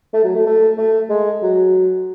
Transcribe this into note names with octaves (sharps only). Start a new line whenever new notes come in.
A3
F#3
A3
A3
A3
G#3
F#3